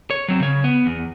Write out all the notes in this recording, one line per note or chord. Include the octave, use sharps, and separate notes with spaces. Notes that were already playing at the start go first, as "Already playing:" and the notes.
C#5
F#3 C4
C#3 C#5
B3
E2